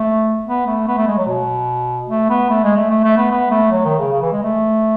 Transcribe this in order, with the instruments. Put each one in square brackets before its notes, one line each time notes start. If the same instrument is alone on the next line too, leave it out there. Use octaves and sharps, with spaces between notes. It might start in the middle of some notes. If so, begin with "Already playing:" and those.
Already playing: [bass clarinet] A3
B3
A3
B3
A3
G#3
F#3
B2
A3
B3
A3
G#3
A3
A3
A3
B3
B3
A3
F#3
D#3
C#3
C#3
E3
G#3
A3